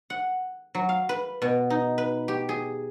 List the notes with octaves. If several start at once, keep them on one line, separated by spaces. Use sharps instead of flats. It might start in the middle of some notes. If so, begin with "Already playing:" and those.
F#5
F#3
F5
B4
B2
D#4
B4
G4
G#4